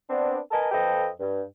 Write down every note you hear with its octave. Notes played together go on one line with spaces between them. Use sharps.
B3 C4 D4
A#4 B4 D#5 G#5 A5
F2 F3 A4 B4 D#5 G5
G2